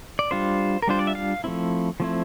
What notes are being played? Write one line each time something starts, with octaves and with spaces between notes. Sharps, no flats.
D5
G3 D4 F4 C5
A#4
G3 D4 F4 C5
D5
E5
F5
F3 A3 C4 E4
F3 A3 C4 E4